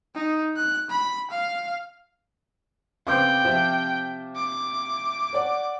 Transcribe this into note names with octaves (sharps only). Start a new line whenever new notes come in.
D#4
F#6
B5
F5
C#3 B3 C4 G5 C6 D6 G6
C3 F3 E5 F5
D6
C#5 D5 F#5